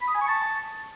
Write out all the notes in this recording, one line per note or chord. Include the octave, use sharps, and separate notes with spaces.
B5
D#6
G#5
C#6
A5